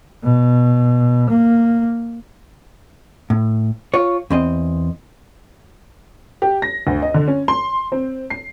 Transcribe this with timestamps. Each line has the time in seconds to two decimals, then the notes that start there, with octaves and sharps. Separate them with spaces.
0.23 B2
1.29 A#3
3.30 A2
3.94 F4 C#5
4.30 E2 C4 D#5
6.42 G4
6.62 A#6
6.87 D2
7.02 D#5
7.14 D3
7.28 C#4
7.48 C6
7.92 C4
8.30 C7